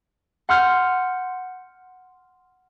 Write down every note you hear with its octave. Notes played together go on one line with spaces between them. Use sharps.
F#5 C6 F6 G6